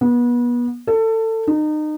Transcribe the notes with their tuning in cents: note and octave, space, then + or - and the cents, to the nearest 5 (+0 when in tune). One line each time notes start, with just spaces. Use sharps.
B3 -30
A4 +25
D#4 -30